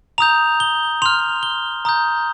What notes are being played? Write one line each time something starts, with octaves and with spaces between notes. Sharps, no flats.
A#5 D#6 G6 F7
G7
C6 F6 F7
G7
A#5 D#6 G6